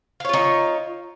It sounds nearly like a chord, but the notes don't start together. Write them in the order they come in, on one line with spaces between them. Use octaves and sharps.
F5 C#5 F4 D#4